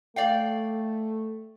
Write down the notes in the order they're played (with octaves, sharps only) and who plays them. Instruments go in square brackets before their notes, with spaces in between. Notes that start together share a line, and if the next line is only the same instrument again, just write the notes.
[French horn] A3 [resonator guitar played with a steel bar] D5 F5 G5